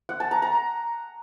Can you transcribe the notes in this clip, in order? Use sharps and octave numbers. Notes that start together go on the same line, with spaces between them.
F#5
A5
A#5
A#5